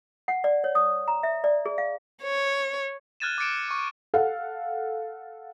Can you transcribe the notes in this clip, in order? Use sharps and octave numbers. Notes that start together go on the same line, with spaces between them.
F#5
D5
C#5
D#6
A#5
E5
D5
G#4
F5
C#5
F6 F#6 G#6 A6 D#7 E7
D6 F6 A6 C#7 D7 E7
C#6 D6
A4 F5 F#5